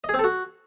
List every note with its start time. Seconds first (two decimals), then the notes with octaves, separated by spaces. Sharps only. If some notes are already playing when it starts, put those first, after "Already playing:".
0.04 D#5
0.09 G#4
0.14 C4
0.19 A4
0.24 F#4